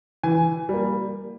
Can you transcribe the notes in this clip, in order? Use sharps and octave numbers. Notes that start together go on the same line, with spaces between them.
E3 G#5
G3 A#3